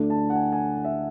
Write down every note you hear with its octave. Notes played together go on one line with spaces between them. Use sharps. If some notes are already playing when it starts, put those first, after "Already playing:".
Already playing: D2 D3 A3 D4
A5
F#5
G#5
G#5
E5